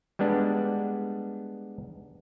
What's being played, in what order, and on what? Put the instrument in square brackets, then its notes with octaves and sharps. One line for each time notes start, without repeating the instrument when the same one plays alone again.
[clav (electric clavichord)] G3 G#3 B3 D4